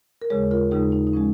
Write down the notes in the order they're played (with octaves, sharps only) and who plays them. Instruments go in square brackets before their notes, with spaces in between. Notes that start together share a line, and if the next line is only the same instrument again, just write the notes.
[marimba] A#4
D#2 C#3 G#3 G#4 C#5
F4 A#4
D#2 C#3 G#3 D#4 G#4
D#4
D#4
F3 G#3 C#4